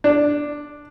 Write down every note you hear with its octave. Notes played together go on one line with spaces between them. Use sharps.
D4